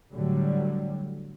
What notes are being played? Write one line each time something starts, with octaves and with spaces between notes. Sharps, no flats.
A2 D3 F#3 G3